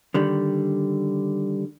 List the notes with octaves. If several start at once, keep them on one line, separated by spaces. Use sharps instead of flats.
D3 D#3 G3